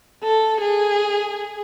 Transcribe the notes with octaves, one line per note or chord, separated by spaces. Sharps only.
A4
G#4